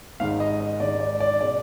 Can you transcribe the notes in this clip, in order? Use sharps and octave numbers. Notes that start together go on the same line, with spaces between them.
G#1 G#2 D#3 G#3 F5
D#5
D#5
G#1 G#2 D#3 G#3 D5
D5
D5
B2 G#3 D5